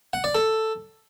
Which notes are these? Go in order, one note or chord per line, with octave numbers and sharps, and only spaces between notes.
F#5
D5
A4